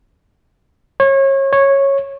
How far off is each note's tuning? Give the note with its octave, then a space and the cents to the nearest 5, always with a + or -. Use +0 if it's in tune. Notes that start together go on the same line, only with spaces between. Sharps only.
C#5 -30
C#5 -10